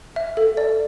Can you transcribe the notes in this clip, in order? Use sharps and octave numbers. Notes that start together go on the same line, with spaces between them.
E5
A4
D5